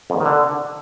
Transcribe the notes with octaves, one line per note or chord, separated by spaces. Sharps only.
F2
E2
D#3
D3